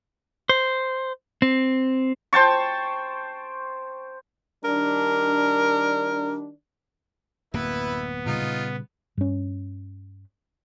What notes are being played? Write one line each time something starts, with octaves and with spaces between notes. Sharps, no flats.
C5
C4
C5 G5 A5 C#6
D#3 G3 D4 A#4
D1 F#2 A#3 B3 E4 B4
A#2 C#3 G3 D#4 F4
G2 C#4